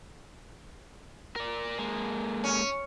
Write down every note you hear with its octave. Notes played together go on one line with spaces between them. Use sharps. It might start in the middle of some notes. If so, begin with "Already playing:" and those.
A#4 D5
G#3 A#3
C#4